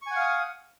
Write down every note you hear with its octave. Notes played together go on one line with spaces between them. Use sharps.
F5 F#5 G#5 C#6 D#6